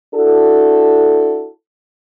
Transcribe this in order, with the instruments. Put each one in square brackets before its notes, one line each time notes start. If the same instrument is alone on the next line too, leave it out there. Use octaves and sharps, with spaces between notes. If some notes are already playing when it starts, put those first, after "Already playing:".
[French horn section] D4 E4 F#4 A4